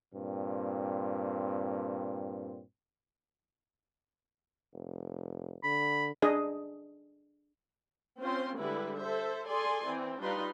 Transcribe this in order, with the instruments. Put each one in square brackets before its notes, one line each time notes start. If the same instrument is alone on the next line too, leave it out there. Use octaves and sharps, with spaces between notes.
[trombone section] G2 A#2 C4
[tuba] F1
[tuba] D3 [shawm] B5
[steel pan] D4 G#4 D#5
[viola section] C4 C#4 F4 C5 C6
D3 G3 G#3 E4 B4
A4 C5 E5
G#4 A4 D5 G#5 C6
E3 C4
G3 D4 D#4 F4 B4 C6